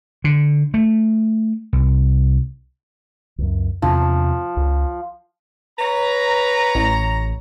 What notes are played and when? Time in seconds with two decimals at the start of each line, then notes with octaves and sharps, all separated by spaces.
0.24 D3
0.74 A3
1.73 C2
3.38 C#2 F#2
3.82 E2 C3 F3 D4
4.57 C#2
5.78 B4 C#5 A#5
6.75 A1